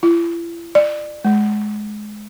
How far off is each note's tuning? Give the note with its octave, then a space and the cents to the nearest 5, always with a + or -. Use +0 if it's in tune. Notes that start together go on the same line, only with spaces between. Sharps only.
E4 +45
D5 +30
G#3 +20